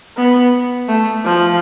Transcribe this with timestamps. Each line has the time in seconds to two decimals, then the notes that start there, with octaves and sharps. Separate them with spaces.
0.17 B3
0.88 A3
1.25 F3